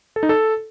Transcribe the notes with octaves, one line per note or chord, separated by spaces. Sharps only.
A4
D#4
A4